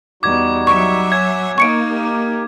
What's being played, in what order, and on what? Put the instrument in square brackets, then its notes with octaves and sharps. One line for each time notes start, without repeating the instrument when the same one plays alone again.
[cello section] E2 [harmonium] G3 D#4 F#4 [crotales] D6 G#6
[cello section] F#3 E5 [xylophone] C#6
[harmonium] C#5 F#5 G#5 [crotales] G#6
[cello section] A#3 D#4 [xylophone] C#6 C#7 D7
[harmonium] G4 A#4